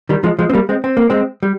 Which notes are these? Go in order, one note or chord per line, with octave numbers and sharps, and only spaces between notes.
D#3 G3
F3 G#3
F3 G#3
C4
G3 A#3
G#3 C4
C4
A#3
G#3 C4
G3